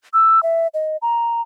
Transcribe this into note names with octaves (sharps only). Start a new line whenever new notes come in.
E6
E5
D#5
A#5